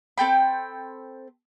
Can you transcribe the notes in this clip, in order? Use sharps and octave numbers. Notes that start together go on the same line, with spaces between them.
C4 A4 G5 B5